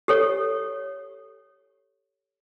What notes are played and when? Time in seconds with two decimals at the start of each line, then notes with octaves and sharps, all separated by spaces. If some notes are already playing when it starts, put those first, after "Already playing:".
0.08 G4 A4 C#5